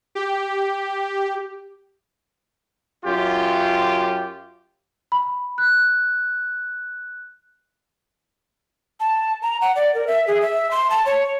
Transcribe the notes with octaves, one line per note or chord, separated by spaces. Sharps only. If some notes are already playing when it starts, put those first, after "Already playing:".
G4
F#2 F4 G4
B5
F#6
A5
A#5
F#5
D5
A#4
E5
G#4
E5
C6
A5
C#5